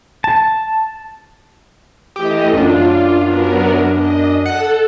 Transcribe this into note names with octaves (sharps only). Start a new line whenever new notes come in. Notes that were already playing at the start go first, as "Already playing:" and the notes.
A5
E3 A3 G4 D#5
F#2 D4 F4
F#3 B3 A#4
D#5
A4 F#5